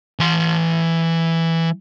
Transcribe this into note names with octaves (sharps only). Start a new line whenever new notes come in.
E3 C6